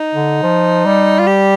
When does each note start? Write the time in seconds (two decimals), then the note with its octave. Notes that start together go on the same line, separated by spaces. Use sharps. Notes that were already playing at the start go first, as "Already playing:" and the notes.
Already playing: D#4
0.14 D3
0.43 F3
0.85 G3
1.20 F4
1.27 G4